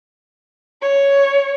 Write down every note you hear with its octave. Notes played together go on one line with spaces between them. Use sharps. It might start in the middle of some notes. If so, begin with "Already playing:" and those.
C#5